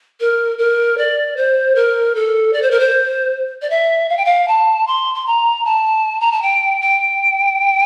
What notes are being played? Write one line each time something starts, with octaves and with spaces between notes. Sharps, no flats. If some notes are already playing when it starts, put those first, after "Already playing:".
A#4
A#4
D5
C5
A#4
A4
D5
C5
A#4
C5
D5
E5
F5
G5
F5
A5
C6
C6
A#5
A5
A#5
A5
G5
G5